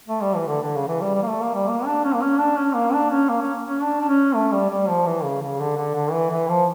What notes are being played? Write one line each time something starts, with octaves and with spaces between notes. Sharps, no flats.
A3
G3
E3
D3
D3
C#3
E3
G3
G3
A#3
A3
A#3
G3
A#3
D4
C#4
A#3
C#4
D4
C#4
A#3
D4
C#4
A#3
C#4
C#4
D4
D4
C#4
A3
G3
G3
F3
E3
C#3
C#3
D3
D3
D3
E3
E3
F3